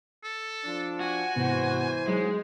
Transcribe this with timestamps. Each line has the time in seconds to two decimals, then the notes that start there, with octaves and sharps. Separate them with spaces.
0.24 A4
0.65 F3 D4
1.01 F#4 G#5
1.36 G#2 C3 E3 B3 C5
2.07 F#3 G#3 D#4